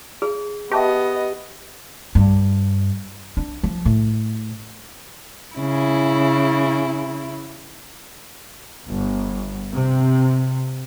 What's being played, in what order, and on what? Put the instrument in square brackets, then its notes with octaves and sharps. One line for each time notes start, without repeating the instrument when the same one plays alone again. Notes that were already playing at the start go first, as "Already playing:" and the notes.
[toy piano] G#4
[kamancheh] B3 D#5 [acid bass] G4 [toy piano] E5 A5 C#6
[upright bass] G2
D4
F3
A2
[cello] C#3 E4
[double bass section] G1
C3